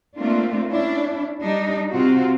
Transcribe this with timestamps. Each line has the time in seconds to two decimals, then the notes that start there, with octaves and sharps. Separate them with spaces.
0.17 A3 A#3 C4 D4 F4
0.69 C#4 D4 E4
1.40 G3 D4 D#4
1.90 C3 C4 F4 F#4